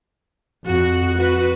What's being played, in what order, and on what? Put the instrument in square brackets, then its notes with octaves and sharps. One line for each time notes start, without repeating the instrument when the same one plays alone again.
[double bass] F2 [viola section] F#4
[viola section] F#4 B4